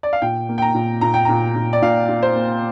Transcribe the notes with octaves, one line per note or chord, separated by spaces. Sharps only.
D5
F5
A#2 G5
A#3
G5
A#5
A#2
A#2 A#5
G5
A#2 A#5
A#2
D5
A#2 F5
F4
C5
A#3